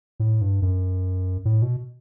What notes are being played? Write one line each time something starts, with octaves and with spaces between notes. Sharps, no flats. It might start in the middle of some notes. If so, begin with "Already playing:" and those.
A2
G2
F#2
A2
B2